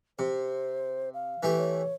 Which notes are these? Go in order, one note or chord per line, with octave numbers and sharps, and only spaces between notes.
C3 C5
F5
E3 A3 G4
C#5